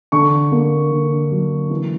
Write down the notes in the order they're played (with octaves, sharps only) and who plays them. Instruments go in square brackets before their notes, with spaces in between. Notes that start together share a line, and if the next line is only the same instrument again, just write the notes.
[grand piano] D3 C#6
A#3
D3
F#3
E3